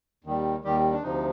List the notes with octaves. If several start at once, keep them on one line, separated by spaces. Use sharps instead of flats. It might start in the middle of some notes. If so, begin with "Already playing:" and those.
D#2 D#3 G3
D#2 D#3 G3 G4
D4
D2 C3 F3 D#4